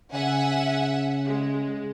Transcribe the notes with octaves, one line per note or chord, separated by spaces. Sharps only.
C#3 E5 F#5 G#5
G#3